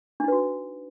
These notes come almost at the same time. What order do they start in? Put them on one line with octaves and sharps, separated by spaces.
D4 D#4 B4 F#4